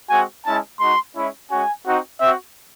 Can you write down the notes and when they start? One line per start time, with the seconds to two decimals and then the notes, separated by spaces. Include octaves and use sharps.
0.10 G#3 C4 F#4 G#5
0.46 G#3 C#4 E4 A5
0.80 G#3 D#4 F#4 C6
1.16 G#3 C#4 E4
1.50 G#3 C#4 F#4 G#5
1.86 C4 D#4 F#4
2.21 C4 F#4 E5